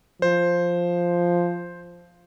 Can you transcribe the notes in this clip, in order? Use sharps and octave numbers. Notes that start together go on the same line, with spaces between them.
F3 C5